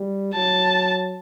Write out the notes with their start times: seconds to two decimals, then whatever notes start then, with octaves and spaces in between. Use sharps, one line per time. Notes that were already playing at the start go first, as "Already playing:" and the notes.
Already playing: G3
0.34 F#3 A5